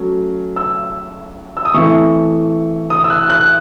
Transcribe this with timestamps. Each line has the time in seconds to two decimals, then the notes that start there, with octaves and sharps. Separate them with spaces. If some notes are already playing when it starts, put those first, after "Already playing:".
Already playing: F#3 A3 C#4
0.56 E6
1.57 E6
1.65 D#6
1.74 A2 E3 A3 C4 E4 C#6
2.90 D#6
3.04 E6
3.10 F#6
3.30 F#6